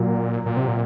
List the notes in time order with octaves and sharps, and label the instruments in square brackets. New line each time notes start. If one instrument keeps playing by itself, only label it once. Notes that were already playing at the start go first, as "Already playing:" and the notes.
Already playing: [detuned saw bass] A#2 [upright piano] F#3
[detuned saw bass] A#2
C3
A#2